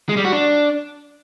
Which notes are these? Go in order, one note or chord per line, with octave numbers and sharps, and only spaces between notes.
G#3
G3
F#4
D4